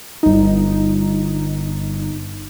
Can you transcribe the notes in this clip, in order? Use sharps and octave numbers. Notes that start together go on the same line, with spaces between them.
G1 D#4